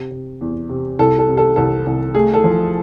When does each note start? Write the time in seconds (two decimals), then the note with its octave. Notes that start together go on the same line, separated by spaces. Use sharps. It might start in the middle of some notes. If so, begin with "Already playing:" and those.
Already playing: C3
0.11 C3
0.41 E2
0.69 C3
0.99 C2 A4
1.19 A4
1.28 C3
1.37 A4
1.56 C2 A4
1.86 C2
2.15 A3 G#4
2.34 A4
2.44 F3